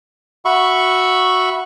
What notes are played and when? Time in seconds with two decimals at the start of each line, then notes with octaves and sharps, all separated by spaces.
0.45 F#4 E5 B5 C#6